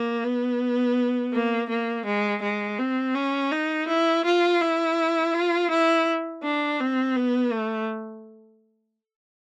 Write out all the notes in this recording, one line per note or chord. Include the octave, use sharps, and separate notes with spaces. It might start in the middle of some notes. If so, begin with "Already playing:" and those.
Already playing: A#3
B3
A#3
A#3
G#3
G#3
C4
C#4
D#4
E4
F4
E4
F4
E4
D4
C4
B3
A3